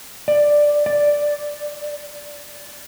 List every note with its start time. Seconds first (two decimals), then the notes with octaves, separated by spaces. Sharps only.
0.28 D5
0.86 D5